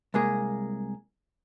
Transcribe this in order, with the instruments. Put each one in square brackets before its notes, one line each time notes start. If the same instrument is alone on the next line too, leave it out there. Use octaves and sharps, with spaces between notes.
[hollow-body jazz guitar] C2 G#3 A#3 G#4